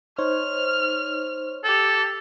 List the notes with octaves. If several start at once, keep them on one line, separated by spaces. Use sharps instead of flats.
D#4 C5 C#5 F6
G4 A4